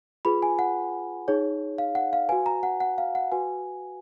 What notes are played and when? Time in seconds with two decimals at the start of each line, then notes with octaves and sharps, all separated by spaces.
0.25 F4 G#4 B4 B5
0.42 G#5
0.59 F#5
1.28 D#4 G#4 C#5
1.78 F5
1.95 F#5
2.13 F5
2.29 F#4 B4 G#5
2.46 A#5
2.63 F#5
2.80 F#5
2.98 F5
3.15 F#5
3.32 F#4 B4 G#5